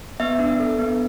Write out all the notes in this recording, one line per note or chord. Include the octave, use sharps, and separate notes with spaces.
B3 E5
D4
A4
B3